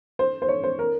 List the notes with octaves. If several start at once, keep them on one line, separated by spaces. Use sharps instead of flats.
C5
C5
C#5
C5
A#4